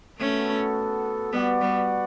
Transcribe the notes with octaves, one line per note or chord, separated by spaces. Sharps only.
A3 B3 C#4 F#4 A4
G3 B3 F#4 B4 D5 F#5
G3 B3